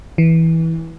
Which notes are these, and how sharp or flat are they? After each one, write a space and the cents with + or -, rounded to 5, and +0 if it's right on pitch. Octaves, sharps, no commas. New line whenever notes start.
E3 -15